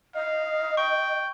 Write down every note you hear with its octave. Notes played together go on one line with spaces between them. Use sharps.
D#5 F5
G5 C#6